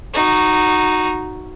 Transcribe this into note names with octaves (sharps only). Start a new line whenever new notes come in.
D#4 F#4